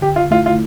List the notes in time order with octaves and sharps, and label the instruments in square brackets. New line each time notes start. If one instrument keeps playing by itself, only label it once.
[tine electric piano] D3 [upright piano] G4
[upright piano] F4
[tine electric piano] A3 E4 [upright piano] F4
[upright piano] F4